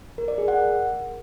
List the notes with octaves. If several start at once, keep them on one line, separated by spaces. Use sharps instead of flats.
A#4
D5
G#4
F#5
A#4